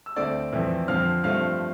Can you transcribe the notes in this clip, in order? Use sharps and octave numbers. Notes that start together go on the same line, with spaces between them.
E6
D2 D3 A3 C4 D5 D6
F2 E3 A3 C4
F2 D3 F3 C4 F5 F6
G2 F3 A3 C4 F5 F6